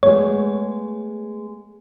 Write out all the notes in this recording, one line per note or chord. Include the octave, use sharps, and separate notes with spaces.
G#3 A3 B3 C#5